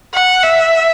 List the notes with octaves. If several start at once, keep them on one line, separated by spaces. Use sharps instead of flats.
F#5
E5